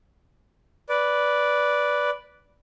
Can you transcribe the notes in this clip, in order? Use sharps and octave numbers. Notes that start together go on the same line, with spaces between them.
B4 D5